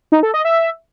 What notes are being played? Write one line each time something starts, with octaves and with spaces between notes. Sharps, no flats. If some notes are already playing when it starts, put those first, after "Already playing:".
D#4
A4
D#5
E5